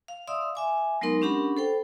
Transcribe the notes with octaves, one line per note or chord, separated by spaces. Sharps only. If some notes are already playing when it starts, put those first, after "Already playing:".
F5
D5 E5 F5 C6 D#6 E6
E5 G#5 D6
F#3 G#3 B3 D#4 A#4 C6
C#4 D4 G4 F#5 B5
A4 C5 G5